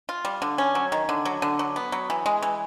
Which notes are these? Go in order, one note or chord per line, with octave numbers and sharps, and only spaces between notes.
F4
G3
D3
C#4
F#3
D#3
D3
F#3
D3
F#3
B3
F#3
E3
G#3
E3